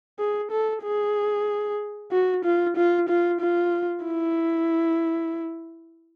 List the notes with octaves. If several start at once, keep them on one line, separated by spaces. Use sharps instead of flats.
G#4
A4
G#4
F#4
F4
F4
F4
F4
E4